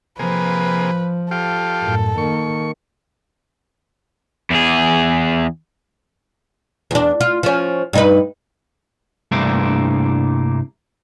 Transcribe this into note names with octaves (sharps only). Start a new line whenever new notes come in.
C3 F3 A#3 G#4 B4
F4 G4 A4
F#2 A2
D#3 A#3 C#6
E2 G#4
E2 D4
F4
F3 C#4
G2 D#4 B4
C2 G2 A3 A#3 D4